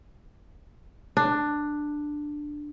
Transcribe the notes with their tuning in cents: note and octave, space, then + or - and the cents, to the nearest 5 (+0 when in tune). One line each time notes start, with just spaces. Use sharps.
D4 +10